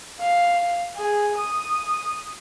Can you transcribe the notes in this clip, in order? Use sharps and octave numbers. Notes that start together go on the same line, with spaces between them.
F5
G#4
D#6